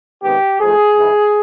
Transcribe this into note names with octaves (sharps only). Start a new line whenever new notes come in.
C3 D#3 G#3 B3 G4
G#2 F3 A3 G#4
G#2 E3 G#3